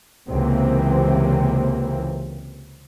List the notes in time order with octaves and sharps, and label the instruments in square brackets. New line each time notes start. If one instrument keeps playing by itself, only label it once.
[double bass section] C#2 C3 E3 A#3 C4